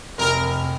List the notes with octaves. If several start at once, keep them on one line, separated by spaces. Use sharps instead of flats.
F1 A#4